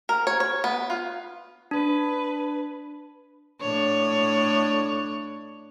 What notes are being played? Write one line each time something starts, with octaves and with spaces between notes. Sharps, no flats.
A#4
C#5
C#5
B3
F4
D4 B4
A2 D4 C#5